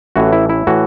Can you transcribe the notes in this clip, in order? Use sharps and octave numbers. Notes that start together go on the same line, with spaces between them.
A1 A2 E3 F#4
E4
E4
A2 E3 F#4